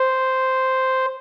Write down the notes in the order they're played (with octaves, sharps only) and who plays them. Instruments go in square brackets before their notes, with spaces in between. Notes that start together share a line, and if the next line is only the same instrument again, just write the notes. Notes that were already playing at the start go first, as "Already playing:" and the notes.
Already playing: [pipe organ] C5